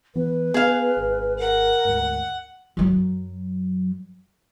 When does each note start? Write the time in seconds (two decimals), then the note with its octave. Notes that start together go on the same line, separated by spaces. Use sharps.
0.15 E3 B3 B4
0.54 B3 G#4 F5
0.97 G#1
1.38 A#4 F#5
1.85 D2 G#2
2.77 F#2 F#3